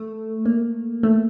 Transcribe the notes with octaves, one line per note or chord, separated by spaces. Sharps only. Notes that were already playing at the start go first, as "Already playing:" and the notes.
Already playing: A3
A#3
A3